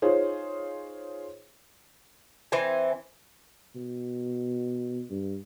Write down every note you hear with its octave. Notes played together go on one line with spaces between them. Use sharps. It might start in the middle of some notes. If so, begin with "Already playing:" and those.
D#4 F4 G#4 C5 C#5
E3 C4 G#5
B2
G2